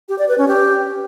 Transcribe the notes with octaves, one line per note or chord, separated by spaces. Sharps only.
G4
D5
B4
C#4
G4